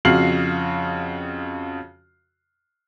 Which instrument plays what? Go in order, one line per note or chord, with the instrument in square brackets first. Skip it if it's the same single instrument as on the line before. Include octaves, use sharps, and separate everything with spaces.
[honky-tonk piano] F2 C#3 F#4 F6 C7 F#7